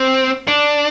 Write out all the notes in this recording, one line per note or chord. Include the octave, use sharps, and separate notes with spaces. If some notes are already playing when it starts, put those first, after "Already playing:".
Already playing: C4
D4